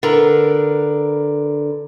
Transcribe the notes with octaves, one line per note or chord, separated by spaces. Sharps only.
D3 A#4 B4